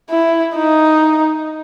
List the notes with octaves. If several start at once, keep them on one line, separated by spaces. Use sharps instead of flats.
E4
D#4